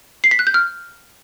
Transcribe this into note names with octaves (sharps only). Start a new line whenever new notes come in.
C7
B6
F#6
G6
F6